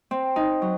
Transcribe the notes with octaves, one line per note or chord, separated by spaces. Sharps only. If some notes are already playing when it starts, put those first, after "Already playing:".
C4
D#4
F#3